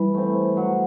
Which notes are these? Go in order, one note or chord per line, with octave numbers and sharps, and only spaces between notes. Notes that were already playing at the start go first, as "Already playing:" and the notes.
Already playing: E3 G3
A3 C4
F#3